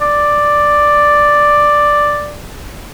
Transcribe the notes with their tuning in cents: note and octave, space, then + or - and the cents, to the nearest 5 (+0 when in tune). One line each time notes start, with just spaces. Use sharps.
D5 +5